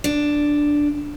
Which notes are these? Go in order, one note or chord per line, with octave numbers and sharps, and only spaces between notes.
D4